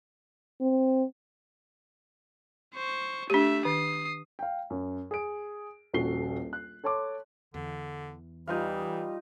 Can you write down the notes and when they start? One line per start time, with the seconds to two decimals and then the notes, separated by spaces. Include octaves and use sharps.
0.61 C4
2.74 C5 C#6
3.30 A3 D4 G4 E5
3.65 D#3 D#6 C7
4.39 F5 G5
4.70 F#2
5.11 G#4 D7
5.93 D#1 A#1 F#4 A4 C7 G7
6.53 F#6
6.84 A4 C#5 A5 C6 D6
7.54 E2 D3
8.47 E3 G3 D#4 F4 F5